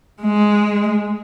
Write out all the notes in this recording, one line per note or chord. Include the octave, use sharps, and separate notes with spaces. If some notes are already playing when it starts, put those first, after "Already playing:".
G#3